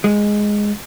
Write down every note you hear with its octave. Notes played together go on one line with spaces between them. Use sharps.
G#3